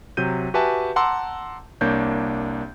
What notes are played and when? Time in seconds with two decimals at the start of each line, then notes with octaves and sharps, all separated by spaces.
0.17 C3 F#3 G6 D#7
0.54 F#4 G4 B4 E5 G#5 A5
0.96 F#5 A5 A#5 C6 D6 E6
1.81 C2 A#3 D4 C#5 G6